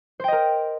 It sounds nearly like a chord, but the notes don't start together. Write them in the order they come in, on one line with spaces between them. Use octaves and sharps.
C5 G5 D#5 A#4